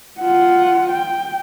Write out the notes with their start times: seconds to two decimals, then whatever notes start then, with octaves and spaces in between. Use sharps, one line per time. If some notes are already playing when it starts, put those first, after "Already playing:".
0.21 F4 F#5
0.91 G5